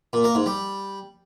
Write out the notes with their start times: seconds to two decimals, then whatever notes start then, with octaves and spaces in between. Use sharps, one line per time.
0.13 A#2
0.24 A#3
0.35 G#2
0.46 G3